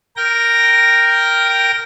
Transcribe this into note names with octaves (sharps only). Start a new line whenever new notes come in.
A#4 G5 A#6